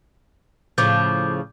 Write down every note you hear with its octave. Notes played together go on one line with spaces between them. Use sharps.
A2 C#3 F3 D6 G6